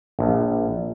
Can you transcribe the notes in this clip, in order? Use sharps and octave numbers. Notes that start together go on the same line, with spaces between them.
A#1